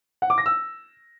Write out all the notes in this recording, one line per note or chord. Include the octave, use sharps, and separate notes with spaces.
F#5
D6
A#6
E6